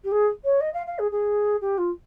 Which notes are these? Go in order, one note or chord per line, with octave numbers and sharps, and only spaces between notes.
G4
G#4
C#5
D#5
F5
F5
G#4
G#4
G4
F4